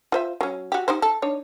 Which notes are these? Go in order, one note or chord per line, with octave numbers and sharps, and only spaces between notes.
F4 C5 E5
F#3 C#4
F#4 G4
D#4 G4 C5
A4
D4 D#4 C#5